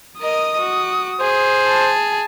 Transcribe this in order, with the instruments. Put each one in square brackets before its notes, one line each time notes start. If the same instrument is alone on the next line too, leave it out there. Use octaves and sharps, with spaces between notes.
[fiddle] A#4 D#5 [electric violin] D#6
[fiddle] F#4
[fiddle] G#4 [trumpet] C5
[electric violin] A5